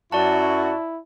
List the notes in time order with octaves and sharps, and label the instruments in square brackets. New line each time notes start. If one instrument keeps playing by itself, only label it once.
[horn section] F#2 F#4 [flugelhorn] E4 [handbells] D5 A5